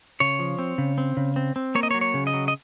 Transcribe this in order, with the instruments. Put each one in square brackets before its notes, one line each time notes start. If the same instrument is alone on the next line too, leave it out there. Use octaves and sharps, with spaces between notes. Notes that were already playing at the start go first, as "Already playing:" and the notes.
[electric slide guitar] C#3 C#5
F3
C4
C#3
C4
C#3
C4
C4
A#3 C#5
D#5
C#5
F#3
C#5
C#3
D#5
F#3
D#5